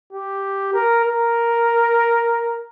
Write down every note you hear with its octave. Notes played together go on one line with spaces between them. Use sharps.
G4
A#4
A#4